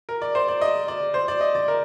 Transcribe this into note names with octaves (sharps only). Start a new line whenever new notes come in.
A#4
D5
C5
D5
D#5
D5
C5
D5
D#5
D5
A#4